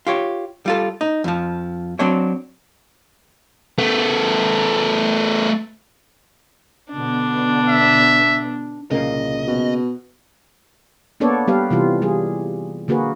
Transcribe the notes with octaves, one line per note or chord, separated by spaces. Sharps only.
F4 G4 C#5
G3 F4 A4
D#4
F2 F3
F#3 C4 D4 C#5
A3 B3
B2 D3 B3 D4
E5
C2 A#2 C#3 A#3 D#5
B2
A#3 B3 D4 A4 C#5 D5
G3 B3 G4 B4 F5
C3 E3 G3 F4
G3 G#4
D3 A#3 F#4 G#4 B4